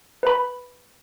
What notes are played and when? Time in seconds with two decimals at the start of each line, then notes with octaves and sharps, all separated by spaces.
0.23 B4 B5